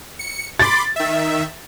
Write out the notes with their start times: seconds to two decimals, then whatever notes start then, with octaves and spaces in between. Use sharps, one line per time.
0.19 C#7
0.59 B5 C6 D6 A6
0.96 D#3 E5